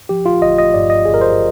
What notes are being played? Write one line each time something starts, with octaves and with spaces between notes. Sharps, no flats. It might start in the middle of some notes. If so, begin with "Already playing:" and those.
F3 G4
F4
G1 D#5
D#5
G2 D5
D#5
G1 G#4
A#4
C5